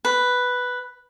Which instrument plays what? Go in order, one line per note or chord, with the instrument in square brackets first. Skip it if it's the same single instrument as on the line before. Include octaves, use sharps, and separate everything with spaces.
[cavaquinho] B4